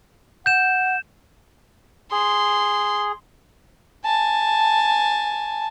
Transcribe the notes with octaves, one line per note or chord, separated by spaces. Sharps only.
F#5 G6 E7
G#4 C6
G#5 A5